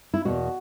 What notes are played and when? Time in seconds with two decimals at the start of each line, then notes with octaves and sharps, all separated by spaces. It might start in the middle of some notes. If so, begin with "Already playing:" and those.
0.14 E4
0.25 E2 B2 A#3 F#4